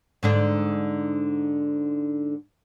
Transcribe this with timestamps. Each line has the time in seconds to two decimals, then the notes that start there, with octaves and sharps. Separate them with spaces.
0.23 G#2 D3 D4